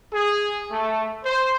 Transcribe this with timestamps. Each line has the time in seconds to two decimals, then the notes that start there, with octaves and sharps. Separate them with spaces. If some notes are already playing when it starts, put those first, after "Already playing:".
0.13 G#4
0.71 A3
1.24 C5